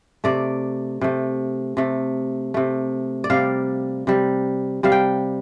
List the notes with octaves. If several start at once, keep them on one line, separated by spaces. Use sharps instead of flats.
C3 A3 D5
C3 A3
C3 A3
C3 A3
D5
C3 G3 F5
C3 G3
C3 G3 F5
G5